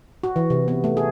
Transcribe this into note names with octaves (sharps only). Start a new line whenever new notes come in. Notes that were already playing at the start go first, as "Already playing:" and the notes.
F#4
E3
C3
B3
A3
G#4